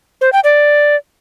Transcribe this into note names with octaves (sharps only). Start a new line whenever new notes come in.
C5
G5
D5